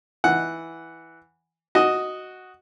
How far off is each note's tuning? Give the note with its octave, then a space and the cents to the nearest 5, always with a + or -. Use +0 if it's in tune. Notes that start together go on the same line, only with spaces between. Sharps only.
E3 +0 F#5 +0
F#4 +0 D#5 +0